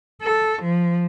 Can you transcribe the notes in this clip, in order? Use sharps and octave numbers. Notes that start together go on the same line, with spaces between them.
A4
F3